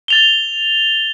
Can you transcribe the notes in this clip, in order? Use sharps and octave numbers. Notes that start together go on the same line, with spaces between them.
A6 F7 G7